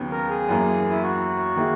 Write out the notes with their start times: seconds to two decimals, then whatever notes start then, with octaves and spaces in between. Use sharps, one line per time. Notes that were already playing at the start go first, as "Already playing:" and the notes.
Already playing: D#2 C#3 F#3 B3
0.12 A#4
0.30 G#4
0.49 F#2 E3 A#3
0.91 E4
1.02 F#4
1.56 D#3 A#3 E4 G#4